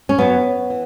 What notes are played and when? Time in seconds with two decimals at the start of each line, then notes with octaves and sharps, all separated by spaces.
0.09 C#4
0.18 F#2 F#3 B3
0.70 E3